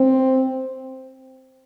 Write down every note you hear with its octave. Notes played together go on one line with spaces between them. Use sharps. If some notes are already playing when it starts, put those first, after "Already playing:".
Already playing: C4